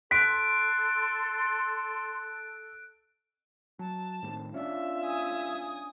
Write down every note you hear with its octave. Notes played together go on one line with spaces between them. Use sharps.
A4 C6 F#6 B6 D7
F#3 A5
A2 D#3 G3 C4
C#4 D4 F4 E5
G#5 D#6